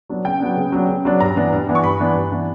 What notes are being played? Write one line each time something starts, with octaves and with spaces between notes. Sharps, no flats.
F#3 B3 D4
C#3 G5
F#3 B3 D4
C#3
F#3 B3 D4
C#3
F#3 B3 D4
G2 A#5
E3 B3 D4
G2
E3 B3 D4
C#6
G2 B5
E3 B3 D4
G2
E3 B3 D4